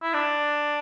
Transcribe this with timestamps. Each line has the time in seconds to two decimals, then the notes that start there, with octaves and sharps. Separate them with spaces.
0.03 E4
0.13 D4